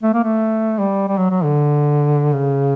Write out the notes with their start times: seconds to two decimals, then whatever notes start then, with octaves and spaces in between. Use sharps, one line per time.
0.03 A3
0.13 A#3
0.24 A3
0.79 G3
1.08 G3
1.18 F#3
1.30 F#3
1.44 D3
2.33 C#3